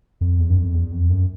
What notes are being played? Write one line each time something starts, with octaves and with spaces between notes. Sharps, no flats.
F2
E2
F#2
F2
E2
F2
F#2